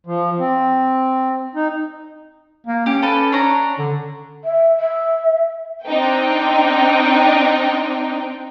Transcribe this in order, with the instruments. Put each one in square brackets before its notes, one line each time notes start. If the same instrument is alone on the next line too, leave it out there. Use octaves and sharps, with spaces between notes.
[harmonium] F3
C4
D#4
[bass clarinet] A#3
[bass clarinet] C#4 [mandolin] G4
[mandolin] A4 B4 A5
D4 C#5 A#5
[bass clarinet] D3
[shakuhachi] E5
E5
[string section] C4 D4 D#4 G5